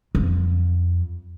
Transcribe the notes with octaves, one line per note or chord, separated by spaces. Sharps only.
F2